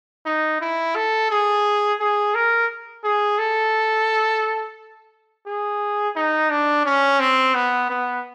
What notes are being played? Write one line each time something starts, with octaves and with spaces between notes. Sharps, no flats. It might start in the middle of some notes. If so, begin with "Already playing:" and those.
D#4
E4
A4
G#4
G#4
A#4
G#4
A4
G#4
D#4
D4
C#4
C4
B3
B3